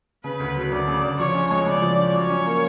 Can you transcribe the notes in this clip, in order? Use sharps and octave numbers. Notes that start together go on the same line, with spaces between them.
C#3 B4
D2
F#3
D2 D5
C#3
D2
F3 C#5
C#4
G#3
C#3 D5
F3
C#4
F#3 C#5
C#4
A#3